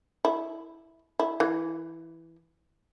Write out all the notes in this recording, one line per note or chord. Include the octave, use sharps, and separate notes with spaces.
E4
E4
E3